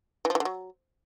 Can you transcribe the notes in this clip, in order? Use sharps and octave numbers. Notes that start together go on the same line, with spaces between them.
E3
F3
E3
D3
F#3